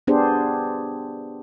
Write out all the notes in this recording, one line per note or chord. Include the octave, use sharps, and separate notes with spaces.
B3 D4 G4 G#4 C5